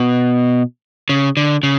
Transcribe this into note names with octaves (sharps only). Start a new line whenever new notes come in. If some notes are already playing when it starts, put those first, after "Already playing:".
Already playing: B2
C#3
D3
C#3